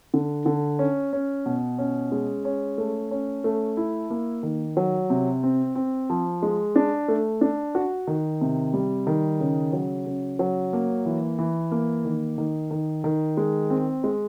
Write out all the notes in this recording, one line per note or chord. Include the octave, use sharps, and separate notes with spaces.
D3
D3
C#4
C#4
B2
C#4
G#3
C#4
A3
C#4
A3
E4
A#3
D#3
F#3
C3
C4
C4
F3
G#3
D4
A3
D4
F#4
D#3
C3
G3
D#3
C#3
F#3
C#3
F#3
A#3
E3
E3
A#3
D#3
D#3
D#3
D#3
G#3
C4
G#3